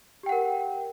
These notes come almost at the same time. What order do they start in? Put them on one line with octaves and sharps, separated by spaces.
G4 G5 F#5 A#4